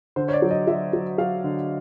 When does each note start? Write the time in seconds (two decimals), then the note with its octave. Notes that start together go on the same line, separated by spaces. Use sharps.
0.16 D3 C5
0.28 C#5
0.33 D5
0.42 F#3
0.51 D#5
0.67 F#3 E5
0.93 F#3
1.18 F#3 F5
1.44 D3